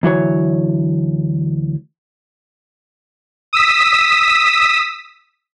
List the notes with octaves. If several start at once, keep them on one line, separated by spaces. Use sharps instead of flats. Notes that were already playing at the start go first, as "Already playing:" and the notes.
D2 E3 F#3 C#5
D#6 E6 B6